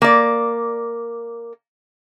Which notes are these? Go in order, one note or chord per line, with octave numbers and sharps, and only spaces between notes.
A#3 D5